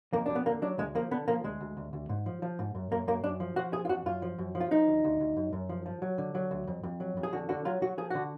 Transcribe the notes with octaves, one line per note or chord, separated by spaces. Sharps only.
F2 A#3
F2 D4
B3
D3 A#3
F#3 D4
D2 G#3
F3 A#3
D3 B3
F3 A#3
D2 G#3
D2
D2
D2
G#2
F3
F3
G#2
F#2
F#2 A#3
F#2 A#3
F#2 D4
F3
F3 F#4
F2 G#4
F4
F2 F#4
F#2 F4
F3
F#2
F3
F4
F3 D#4
D2
D2
D2
F#2
F#2
F3
F3
F#3
D3
F#3
D2
F2
F2
F#3
F2
G#4
D3 F#4
D3 F#4
F#3 F4
F#3 F#4
F3 G#4
D3 F#4